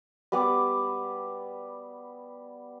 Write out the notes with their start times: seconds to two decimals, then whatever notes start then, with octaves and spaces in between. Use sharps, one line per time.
0.32 G3 B3 D6